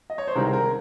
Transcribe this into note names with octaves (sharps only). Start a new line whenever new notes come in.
D#5
C#5
C5
C2 C3 D#3 G#3 C4 A#4
A#4